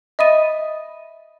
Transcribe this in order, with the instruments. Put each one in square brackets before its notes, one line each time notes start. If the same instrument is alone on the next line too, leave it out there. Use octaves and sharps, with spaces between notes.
[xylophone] D#5 E5 B5 D#6 A6 D#7